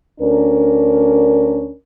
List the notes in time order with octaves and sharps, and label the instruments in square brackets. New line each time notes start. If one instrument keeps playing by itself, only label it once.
[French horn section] D2 C#4 D4 A#4